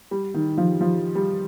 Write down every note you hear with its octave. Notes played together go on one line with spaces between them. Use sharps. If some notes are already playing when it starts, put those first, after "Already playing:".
G3
D#3
F3
F3
G3